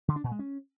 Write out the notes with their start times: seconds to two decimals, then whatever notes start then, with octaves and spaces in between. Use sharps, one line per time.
0.08 D3
0.16 D4
0.24 A#2
0.31 G#3
0.39 C#4